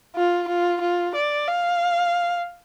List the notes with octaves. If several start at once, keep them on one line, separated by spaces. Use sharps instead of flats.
F4
F4
F4
D5
F5